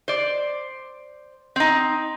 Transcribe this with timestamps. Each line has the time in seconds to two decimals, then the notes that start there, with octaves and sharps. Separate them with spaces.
0.08 C5 D5
1.56 C4 D#4